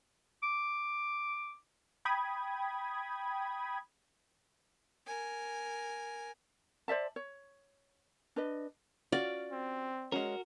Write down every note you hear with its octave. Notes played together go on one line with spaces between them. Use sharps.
D6
G5 B5 D#6 G#6
A#4 G#5
C5 D5 E5 A5
C#5
D4 B4 D#5
C#4 F4 F#4 D5
C4
G#3 C#4 F#4 A#4